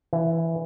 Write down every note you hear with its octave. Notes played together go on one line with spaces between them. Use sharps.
E3